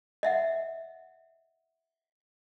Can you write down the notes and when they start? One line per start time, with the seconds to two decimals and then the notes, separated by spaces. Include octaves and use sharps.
0.23 D#5 E5 F#5